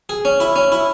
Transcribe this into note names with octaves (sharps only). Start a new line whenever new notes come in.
G#4
C#4
E4
C#4
E4